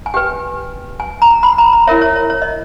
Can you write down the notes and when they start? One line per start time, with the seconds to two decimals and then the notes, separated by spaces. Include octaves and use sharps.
0.06 G#5
0.14 G4 B4 G5
1.00 G#5
1.22 A#5
1.43 B5
1.58 A#5
1.73 A#5
1.87 E4 A#4 C#5 E5
2.01 C#5
2.16 C#5
2.30 C#5
2.42 D#5